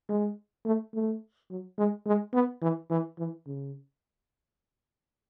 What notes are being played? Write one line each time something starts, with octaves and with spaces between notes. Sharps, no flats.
G#3
A3
A3
F#3
G#3
G#3
B3
E3
E3
E3
C#3